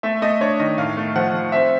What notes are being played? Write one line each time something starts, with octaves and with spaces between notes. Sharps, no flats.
A3 E5
A3 D#5
D4 C#5
D#3 D#5
A2 F5
A3
F3 F#5
F3
C4 E5